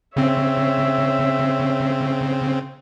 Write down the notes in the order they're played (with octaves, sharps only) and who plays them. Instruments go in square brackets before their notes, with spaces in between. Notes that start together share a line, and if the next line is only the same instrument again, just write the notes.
[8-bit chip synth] C#3 C4 [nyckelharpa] C#5 E5